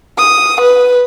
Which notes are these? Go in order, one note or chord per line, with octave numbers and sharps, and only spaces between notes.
D#6
B4